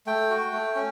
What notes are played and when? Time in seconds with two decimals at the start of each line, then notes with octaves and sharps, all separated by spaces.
0.06 A3 G5
0.30 F#4
0.53 A3
0.76 C#4